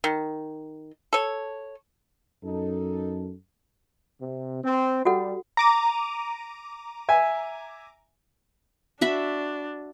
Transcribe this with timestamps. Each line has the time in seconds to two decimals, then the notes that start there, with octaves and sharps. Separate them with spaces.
0.04 D#3
1.13 A4 C#5
2.43 F#2 D#4 A4
4.21 C3
4.64 C4
5.05 G3 F#4 A4 F#5
5.57 A#5 D6 D#7
7.09 E5 G#5
9.01 D4 F#4 E5 B5